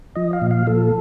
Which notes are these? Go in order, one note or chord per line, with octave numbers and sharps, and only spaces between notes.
F3 D#5
F5
A#2
F5
F3 A4